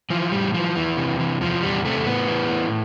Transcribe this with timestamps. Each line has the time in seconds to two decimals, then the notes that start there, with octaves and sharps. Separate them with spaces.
0.10 E3 F3
0.32 A2 G3
0.54 E3 F3
0.75 E2 E3
0.97 C3
1.20 E3
1.41 E2 F3
1.62 E2 G3
1.85 C3 A3
2.06 A2 B3
2.28 E3
2.50 A2